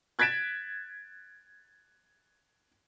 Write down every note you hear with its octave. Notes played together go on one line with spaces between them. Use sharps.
F#6 G#6 A6 B6 D7 E7